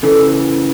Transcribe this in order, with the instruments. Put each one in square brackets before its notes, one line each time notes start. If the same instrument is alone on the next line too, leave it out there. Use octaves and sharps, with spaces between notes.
[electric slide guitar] C#3 E3 [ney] A4